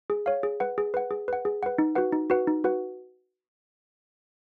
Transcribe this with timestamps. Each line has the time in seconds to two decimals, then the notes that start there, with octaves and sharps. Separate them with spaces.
0.10 G#4
0.26 C#5 F5
0.43 G#4
0.60 B4 F#5
0.78 G#4
0.94 B4 F#5
1.11 G#4
1.28 B4 F#5
1.45 G#4
1.63 B4 F#5
1.78 D#4
1.95 F#4 B4 F#5
2.12 D#4
2.30 F#4 B4 F#5
2.48 D#4
2.64 F#4 B4 F#5